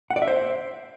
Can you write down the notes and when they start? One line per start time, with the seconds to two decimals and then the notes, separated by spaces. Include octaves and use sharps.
0.10 F#5
0.16 D5
0.22 E5
0.27 C5